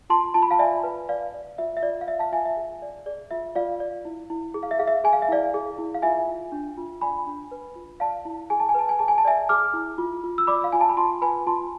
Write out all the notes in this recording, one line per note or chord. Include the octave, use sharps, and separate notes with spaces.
F4 A5 C6
F4 A5
B5
F5 A5
D5 E5 G#5
B4
B4 D5 F5
D5
F4 E5
E5
F4 D5
F5
D5 E5
F5 A5
F4 E5 G#5
E5
G#4
D5
G#4 D5
F4 E5
F4 D5 F5
D5
E4
E4
G#4
F5
E5
G#4 F5
E5
G#4 G#5
F5
E5
E4 D5 F5
G#4
E4
F5
F4 E5 G#5
F4
D4
F4
D5 G#5 B5
D4
B4
F4
D5 F5 A5
E4
G#4 G#5
A5
G#5
B4 A5
G#5
G#4 A5
G#5
A5
D5 E5 G#5
G#4 D6 F6
E4
F4
F4
E6
D5 B5 D6
F5
F4 G#5
A5
B5
F4 A5 C6
B4 G#5 B5
F4 A5 C6